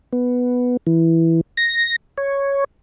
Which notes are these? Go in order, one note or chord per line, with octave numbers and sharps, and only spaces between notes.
B3
E3
A#6
C#5